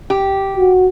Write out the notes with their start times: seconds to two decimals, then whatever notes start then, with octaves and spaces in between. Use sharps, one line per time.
0.10 G4
0.57 F#4